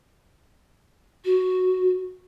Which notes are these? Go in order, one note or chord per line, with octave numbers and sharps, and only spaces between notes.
F#4